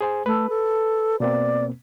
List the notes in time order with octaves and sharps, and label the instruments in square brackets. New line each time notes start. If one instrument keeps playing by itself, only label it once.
[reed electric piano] G#4 C5 G#5
[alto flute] A3 [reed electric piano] B4
[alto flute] A4
[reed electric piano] B2 A#3 C4 [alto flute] D5